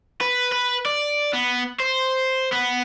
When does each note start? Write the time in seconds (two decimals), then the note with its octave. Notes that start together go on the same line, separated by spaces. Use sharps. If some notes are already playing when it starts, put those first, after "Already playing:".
0.21 B4
0.52 B4
0.86 D5
1.33 B3
1.80 C5
2.52 B3